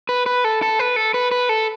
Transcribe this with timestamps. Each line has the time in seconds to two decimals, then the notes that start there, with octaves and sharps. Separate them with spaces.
0.09 B4
0.26 B4
0.44 A4
0.62 A4
0.79 B4
0.96 A4
1.14 B4
1.31 B4
1.49 A4